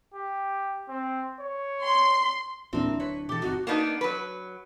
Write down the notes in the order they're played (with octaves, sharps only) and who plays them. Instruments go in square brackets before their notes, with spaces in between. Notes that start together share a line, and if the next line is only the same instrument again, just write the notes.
[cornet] G4
C4
C#5
[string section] C6
[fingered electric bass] A#1 E2 A#2 [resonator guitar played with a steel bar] C4 A#4 [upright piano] D4 E4
[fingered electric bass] D1
[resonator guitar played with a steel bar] B4 C#5
[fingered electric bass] B2 E3 [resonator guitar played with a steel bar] G4 A4
[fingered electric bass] G1 C4 [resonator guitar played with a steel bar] D#4 [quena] F#4
[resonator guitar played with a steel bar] A#3 B3 D4 D#4
F#3 B4